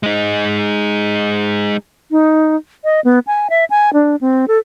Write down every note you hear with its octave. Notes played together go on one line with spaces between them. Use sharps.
G#3 D#4
D#4
D#5
B3
G#5
E5
G#5
D4
C4
A4